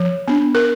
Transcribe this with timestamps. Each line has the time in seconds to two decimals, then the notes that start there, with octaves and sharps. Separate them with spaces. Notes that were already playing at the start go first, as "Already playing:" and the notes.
Already playing: F3
0.28 B3 D4
0.55 A#4